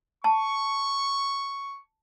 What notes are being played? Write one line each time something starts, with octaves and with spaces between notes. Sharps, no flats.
A5 C#6